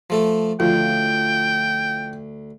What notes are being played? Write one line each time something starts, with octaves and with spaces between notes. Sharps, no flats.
F3 A3 A4
D2 F3 G5